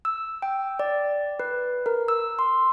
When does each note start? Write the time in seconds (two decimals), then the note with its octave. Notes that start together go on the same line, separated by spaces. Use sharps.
0.05 E6
0.42 G5
0.79 D5
1.40 B4
1.86 A#4
2.08 E6
2.39 C6